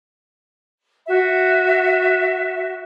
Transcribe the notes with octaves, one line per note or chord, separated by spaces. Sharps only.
F#4 E5